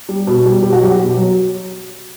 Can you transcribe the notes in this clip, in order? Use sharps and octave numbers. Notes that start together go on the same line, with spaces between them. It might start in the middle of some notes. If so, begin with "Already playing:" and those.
G3
B2
G3
B2 G4
F#4
F#3 G4
B2
F#3